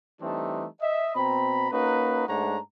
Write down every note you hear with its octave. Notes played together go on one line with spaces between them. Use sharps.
E3 G3 A3 C4 D4 D#4
D#5 E5
B2 C4 A#5 B5
A#3 C#4 D#4 F#4 B4
G#2 A3 D4 C#5 F#5 A#5